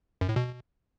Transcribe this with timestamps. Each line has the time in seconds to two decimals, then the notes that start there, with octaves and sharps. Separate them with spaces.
0.21 F#2
0.29 A2
0.36 B2